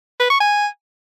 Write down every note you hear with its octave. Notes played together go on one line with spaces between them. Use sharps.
B4
C#6
G#5